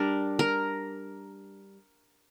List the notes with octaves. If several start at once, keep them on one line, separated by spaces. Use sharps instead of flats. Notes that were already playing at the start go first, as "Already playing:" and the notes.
Already playing: G3 D4 A#4
A#4